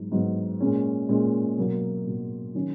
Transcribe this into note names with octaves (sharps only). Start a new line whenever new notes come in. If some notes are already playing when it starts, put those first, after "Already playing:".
Already playing: G#2 F#3 B3
G#2 F#3 B3
A#2 G#3 C#4
A#2 G#3 C#4
B2 F#3 A#3
B2 F#3 A#3
D#3 F#3 C#4